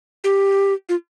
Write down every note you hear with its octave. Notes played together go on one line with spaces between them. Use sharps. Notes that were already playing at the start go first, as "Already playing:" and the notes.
G4
F4